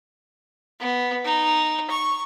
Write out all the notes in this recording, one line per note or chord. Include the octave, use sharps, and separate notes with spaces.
B3
D#4
C#6